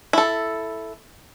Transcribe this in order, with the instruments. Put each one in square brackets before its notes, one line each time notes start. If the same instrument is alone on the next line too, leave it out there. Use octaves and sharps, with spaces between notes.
[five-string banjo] E4 A4